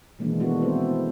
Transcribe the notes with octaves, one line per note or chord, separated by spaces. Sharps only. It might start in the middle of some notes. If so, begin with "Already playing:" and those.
B2 D#3 E3 G#3 A#3 D4
A3 B3 D4 E4 F#4
C4 A4 C5